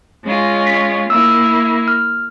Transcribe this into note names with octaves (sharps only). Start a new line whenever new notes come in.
G#3 C#4 F4
B6
A#3 E4 E6
F6